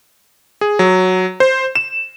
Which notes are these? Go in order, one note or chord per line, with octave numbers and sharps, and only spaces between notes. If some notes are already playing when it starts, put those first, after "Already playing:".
G#4
F#3
C5
E7